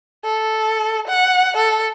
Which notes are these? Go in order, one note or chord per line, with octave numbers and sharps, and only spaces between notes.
A4
F#5
A4